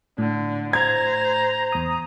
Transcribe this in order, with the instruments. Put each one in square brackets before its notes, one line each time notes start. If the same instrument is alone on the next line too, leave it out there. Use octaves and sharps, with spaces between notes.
[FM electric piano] A2 [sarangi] D3
[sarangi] C5 [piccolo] A#5 [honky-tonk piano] G#6
[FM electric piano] E2 D#6